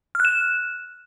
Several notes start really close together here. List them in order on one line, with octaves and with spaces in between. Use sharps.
F6 F#6 E7